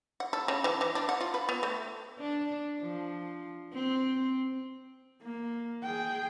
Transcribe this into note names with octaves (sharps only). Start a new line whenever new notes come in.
F#5
A4
C#3
E3
E3
D4
F#5
F4
B4
B3
A3
D4
F3
C4
A#3
G#4 G5